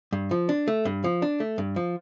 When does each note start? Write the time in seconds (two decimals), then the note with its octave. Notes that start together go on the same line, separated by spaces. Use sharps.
0.13 G2
0.31 F3
0.49 D4
0.68 A3
0.85 G2
1.04 F3
1.22 D4
1.40 A3
1.58 G2
1.76 F3